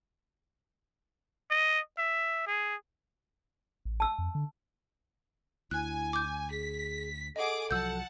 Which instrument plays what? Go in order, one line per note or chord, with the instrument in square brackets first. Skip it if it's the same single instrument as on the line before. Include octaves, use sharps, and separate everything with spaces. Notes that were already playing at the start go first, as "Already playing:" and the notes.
[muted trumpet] D#5
E5
G#4
[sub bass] A1
[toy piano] A5 E6
[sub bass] F2
D3
[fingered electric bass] D2 [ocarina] E4 [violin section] G#5 [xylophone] F#6
[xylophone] D6 G6
[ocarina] G#4 [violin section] B6
[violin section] G#4 D6 [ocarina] A4 [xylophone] D#5 F#5
[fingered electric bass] C2 F3 F#3 [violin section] F#5 A5 [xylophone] E6 G6